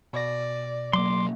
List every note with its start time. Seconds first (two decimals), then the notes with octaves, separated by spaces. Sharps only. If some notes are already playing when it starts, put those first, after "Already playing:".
0.13 B2 D5 A#6
0.93 F#3 A#3 C6 D6